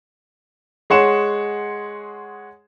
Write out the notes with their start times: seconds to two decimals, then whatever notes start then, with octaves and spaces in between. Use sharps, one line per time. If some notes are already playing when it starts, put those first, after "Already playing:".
0.90 G#3 G#4 C#5 F#5 C6 E7